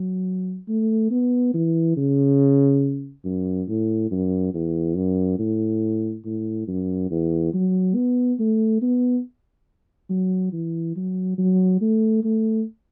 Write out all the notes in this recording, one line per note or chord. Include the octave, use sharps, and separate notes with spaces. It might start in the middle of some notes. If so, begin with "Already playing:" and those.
Already playing: F#3
A3
B3
E3
C#3
F#2
A2
F#2
E2
F#2
A2
A2
F#2
E2
F#3
B3
A3
B3
F#3
E3
F#3
F#3
A3
A3